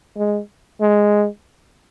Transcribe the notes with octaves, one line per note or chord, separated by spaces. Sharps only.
G#3
G#3